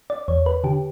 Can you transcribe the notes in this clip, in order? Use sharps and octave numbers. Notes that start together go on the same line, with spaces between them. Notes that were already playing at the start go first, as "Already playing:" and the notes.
D5
E2 C#5
B4
D3 G4